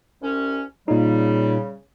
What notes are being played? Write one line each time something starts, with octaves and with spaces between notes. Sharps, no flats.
C2 C#4
A#2 C#3 G3 D#4